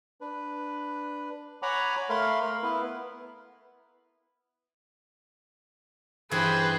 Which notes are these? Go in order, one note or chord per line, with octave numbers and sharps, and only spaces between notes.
D4 B4
C#5 F#5 G#5 A#5 B5 D6
A3 A#4 F5 B5 C6
A#4
B3 E4 B4
G2 E3 G#4 B4 C5